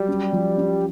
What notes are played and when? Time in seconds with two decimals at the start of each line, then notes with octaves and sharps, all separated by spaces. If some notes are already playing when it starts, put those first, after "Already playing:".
Already playing: F#3 G3
0.08 C#4
0.33 F3
0.57 C#4